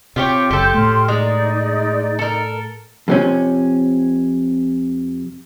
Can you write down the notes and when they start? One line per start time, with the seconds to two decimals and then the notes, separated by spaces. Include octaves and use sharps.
0.16 C3 F4 G4 C#5
0.51 F#1 G4 A4 C6 G6
0.74 A2 A3 C6 F6
1.08 G#3 D#4 D5
2.19 A4 A#4
3.08 F2 C3 C#4